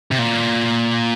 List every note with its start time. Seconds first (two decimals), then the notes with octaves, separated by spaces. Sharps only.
0.11 C3
0.19 A#2